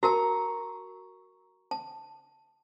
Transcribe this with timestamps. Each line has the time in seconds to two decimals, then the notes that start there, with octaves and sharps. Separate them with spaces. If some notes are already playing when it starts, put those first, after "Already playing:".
0.03 F#4 A#4 A5 A#5 C#6
1.71 A5